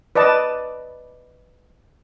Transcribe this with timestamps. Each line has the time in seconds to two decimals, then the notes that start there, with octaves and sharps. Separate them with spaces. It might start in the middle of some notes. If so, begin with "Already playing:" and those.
0.15 B4 D5 D#5 A5